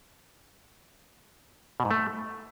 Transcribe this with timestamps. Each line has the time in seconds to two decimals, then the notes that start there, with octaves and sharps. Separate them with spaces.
1.80 B2
1.85 G#2
1.91 A3